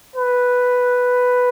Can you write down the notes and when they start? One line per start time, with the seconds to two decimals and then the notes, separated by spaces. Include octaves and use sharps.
0.16 B4